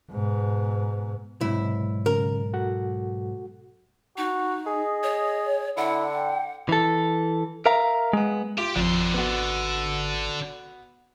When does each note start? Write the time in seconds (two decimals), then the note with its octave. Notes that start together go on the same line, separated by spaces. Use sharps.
0.11 G#2 B2
1.41 B1 G#2 C3 E4
2.06 C#3 A#4
2.53 F#4 A4 F#5
4.17 D#4 F#4
4.67 G#4 D#5
5.03 C#5
5.77 D3 E4 F#5
6.15 G5
6.69 E3 A4
7.66 A#4 E5 F5 A#5
8.13 G#3 B3
8.58 F4 G4 F5
8.76 G#1 F2 D3 C6
9.14 B3 F#4